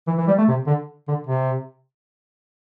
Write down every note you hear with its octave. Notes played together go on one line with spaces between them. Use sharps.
E3
E3
G3
A3
C3
D3
D3
C3